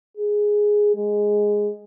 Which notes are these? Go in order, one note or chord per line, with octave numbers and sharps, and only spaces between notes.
G#4
G#3